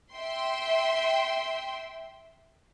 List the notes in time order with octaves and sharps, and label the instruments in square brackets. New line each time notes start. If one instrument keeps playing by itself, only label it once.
[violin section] E5 G5 C6